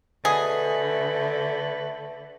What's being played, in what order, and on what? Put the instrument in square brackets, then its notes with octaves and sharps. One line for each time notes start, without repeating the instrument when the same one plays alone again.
[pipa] B2 G#4 [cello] D3 [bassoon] A3 [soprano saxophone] B4